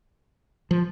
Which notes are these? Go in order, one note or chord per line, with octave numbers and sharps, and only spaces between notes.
F3